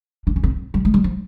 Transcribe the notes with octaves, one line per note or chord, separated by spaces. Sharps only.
D4
C#4
C4
G3
G#3
G3
F3